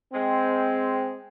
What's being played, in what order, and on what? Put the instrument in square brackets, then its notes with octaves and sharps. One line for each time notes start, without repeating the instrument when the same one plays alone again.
[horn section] G#3 C4